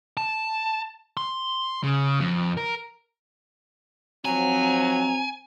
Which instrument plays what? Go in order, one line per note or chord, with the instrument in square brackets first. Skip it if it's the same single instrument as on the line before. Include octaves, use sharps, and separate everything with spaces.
[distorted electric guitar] A5
C6
C#3
F2
A#4
[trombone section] D#3 F3 F#3 [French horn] C4 [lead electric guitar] G#5 [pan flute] A#5